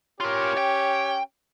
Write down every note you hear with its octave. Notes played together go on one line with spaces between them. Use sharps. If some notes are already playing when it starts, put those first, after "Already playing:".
C#4 F4 G4 A#4 C#5
G5